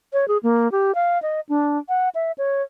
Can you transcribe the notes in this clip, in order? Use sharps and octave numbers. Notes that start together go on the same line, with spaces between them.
C#5
G#4
A#3
G4
F5
D#5
D4
F#5
E5
C#5